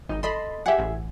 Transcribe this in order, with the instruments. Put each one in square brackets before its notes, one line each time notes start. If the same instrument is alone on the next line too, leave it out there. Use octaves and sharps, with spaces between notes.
[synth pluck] G#1 [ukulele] D#4
[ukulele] A4 D#5 [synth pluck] B5 C6
[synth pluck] G4 F#5 [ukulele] G#4 E5
[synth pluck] A1